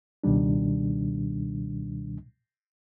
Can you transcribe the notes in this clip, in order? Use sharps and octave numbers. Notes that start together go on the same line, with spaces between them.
C#2 B2 D#3 G3 D4